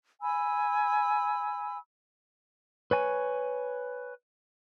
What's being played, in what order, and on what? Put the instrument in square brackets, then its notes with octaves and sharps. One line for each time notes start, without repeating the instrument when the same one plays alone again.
[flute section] G#5 B5 E6
[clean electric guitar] B4 C#5 G#5